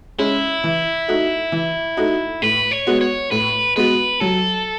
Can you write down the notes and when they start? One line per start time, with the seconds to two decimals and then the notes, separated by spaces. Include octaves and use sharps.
0.19 G#3 C#4 E4
0.64 E3
1.08 A3 D#4 F#4
1.52 E3
1.97 A3 D#4 F#4
2.42 A2 B4
2.71 C#5
2.87 G#3 B3 F#4
3.01 C#5
3.31 A2 B4
3.76 G#3 B3 F#4 B4
4.20 F#3 A4